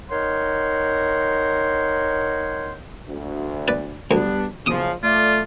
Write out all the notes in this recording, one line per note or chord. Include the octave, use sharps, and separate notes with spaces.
D#4 A#4 C#5 F#5 G5 C6
D2
B4 D5
D2 G3 B3 D4
F#1 C#3 F3 D6 D#6
A3 F4 D5